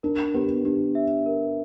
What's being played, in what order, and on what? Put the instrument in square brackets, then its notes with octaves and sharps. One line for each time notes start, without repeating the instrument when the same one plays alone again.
[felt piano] D4 [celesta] A#4
[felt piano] B3 [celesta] G4
[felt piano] D4 [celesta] G4
[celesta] E5
A#4